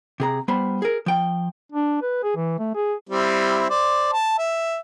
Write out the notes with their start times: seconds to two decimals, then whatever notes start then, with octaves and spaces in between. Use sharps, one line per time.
0.20 C3 G#4 A#5
0.48 G3 B3 C5 B5
0.82 G#4 A#4
1.06 F3 G5
1.72 D4
2.02 B4
2.23 G#4
2.36 E3
2.59 A3
2.75 G#4
3.09 G3 C4 E4
3.70 C5 D5
4.13 A5
4.38 E5